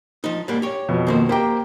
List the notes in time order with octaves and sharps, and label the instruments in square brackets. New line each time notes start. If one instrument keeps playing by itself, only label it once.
[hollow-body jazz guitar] F3 D#4
G#2 G3 A#3
G4 C#5
[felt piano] F2 B2
[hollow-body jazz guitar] D#3 A#3 C5
[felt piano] A#3 G4 A#5 [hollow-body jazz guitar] C5 G5